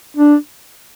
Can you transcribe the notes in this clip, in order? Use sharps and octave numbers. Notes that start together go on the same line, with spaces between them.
D4